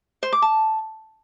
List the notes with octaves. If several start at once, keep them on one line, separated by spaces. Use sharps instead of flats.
C5
D6
A5